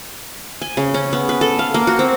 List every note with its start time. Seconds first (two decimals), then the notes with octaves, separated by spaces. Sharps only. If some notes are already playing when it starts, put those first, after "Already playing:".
0.62 G#5
0.77 C#3
0.94 C#4
1.13 B3
1.29 B4
1.41 A4
1.59 F5
1.74 A#3
1.87 F#4
1.99 C4